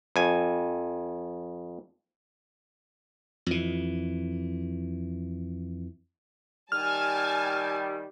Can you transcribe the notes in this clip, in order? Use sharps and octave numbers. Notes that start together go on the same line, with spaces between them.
F2 G#5
F2 E3
D#3 G3 G#5 A5 F6